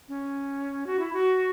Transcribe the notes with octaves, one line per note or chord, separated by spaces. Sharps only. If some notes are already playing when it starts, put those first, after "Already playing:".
C#4
F#4
E4
F#4